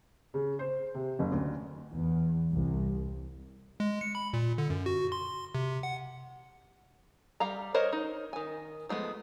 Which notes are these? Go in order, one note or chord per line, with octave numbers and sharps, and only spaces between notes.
C#3
C5
C3
F#1
D2
E2
C2
G#3
C#7
B5
A#2
D3
F#2
F#4
C6
C3
F#5
G3 F5 A#5
A#4 C5 C#5 D#5
D#4
D#3 G#5
F3 G#3 A3 B3